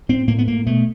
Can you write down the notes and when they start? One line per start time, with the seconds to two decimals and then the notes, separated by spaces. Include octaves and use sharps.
0.09 A2 C4
0.27 A2 A#3
0.38 B3
0.48 A2 A#3
0.66 B2 A3